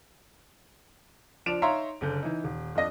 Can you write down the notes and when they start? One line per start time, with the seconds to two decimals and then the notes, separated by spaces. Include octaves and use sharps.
1.46 F3 D4 D5 D7 E7 F7
1.62 D#4 C#5 E5 F5 A#5 C6
2.01 F#1 D3 G6
2.23 E3 D#4
2.44 D#1
2.75 F2 D4 D#5 A#6